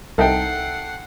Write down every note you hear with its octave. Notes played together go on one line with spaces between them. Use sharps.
C2 D#4 A4 E5 F#5 G5 C7